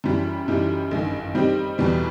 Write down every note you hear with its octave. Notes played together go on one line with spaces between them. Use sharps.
F#2 E3 G3
F#2 E3 G3 D#4 G4
A1 G2 D#3
D#3 G3 C4 D#4 G4
E2 B2 G3 B3